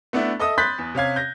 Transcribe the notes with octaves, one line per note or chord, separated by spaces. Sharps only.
A3 B3 D4 E4
A4 D#5 E5 D#6
B5 C6 F#6 G6 A6 B6
E2
C3 C#4 F5 G#6
G6 A#6